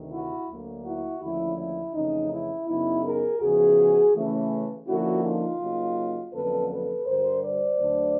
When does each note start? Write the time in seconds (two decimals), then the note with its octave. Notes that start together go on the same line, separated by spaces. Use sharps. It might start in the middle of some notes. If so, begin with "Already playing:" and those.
Already playing: D2 C3 D#3
0.11 E4 F#4
0.48 D2 D3 F#3 A#3
0.84 E4 F#4
1.21 D#2 D3 F3 A3 C#4 E4
1.57 E4
1.94 F2 C#3 E3 A3 C#4 D#4
2.31 E4
2.67 F#2 C#3 F#3 B3 D#4 E4
3.03 G#4 A#4
3.40 E2 C#3 F3 F#4 G#4
4.14 C#3 E3 A3 C#4
4.87 D3 F3 A#3 C#4 E4 F#4
5.23 D#4 F4
5.60 C#3 F#3 A#3 D#4
6.32 F2 D3 F#3 A#3 C#4 A4 B4
6.69 A4 B4
7.06 G2 D3 G3 A#4 C5
7.42 C5 D5
7.79 D2 D3 F#3 A3 D4